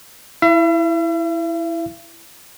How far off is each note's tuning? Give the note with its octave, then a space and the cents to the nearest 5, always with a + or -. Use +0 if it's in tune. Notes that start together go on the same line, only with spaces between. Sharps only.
E4 +0 E5 +45